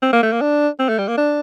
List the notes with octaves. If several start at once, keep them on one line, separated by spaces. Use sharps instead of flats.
C4
A#3
A3
A#3
D4
C4
A3
G3
A#3
D4